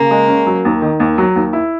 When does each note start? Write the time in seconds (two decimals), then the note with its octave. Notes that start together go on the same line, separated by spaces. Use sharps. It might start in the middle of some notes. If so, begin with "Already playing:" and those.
Already playing: C#3 A#3
0.11 G#3
0.28 C#4
0.47 F#3
0.65 D#2
0.82 D#3
1.00 D#2
1.18 F#3
1.36 D#2
1.53 E4